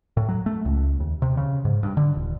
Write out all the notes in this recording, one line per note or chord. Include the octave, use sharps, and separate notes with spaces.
A2
F#3
A3
C#2
D#2
C3
C#3
G#2
G2
D3
D#1